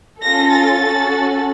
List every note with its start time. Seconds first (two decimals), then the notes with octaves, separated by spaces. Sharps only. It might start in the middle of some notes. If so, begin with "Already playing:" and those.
0.23 C#4 F4 A4 A#6
0.52 A6
0.81 C#4 F#4 A4